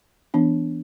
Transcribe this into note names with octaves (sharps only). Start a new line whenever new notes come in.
E3 B3 D4